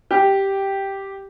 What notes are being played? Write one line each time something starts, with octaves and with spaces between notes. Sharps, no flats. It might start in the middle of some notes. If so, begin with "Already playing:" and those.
G4